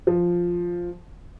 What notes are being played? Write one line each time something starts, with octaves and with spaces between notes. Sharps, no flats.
F3